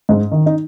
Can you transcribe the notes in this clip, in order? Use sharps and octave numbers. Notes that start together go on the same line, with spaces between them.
G#2
D#3
D#4